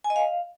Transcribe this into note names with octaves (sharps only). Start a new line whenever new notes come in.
G#5
D#5
F5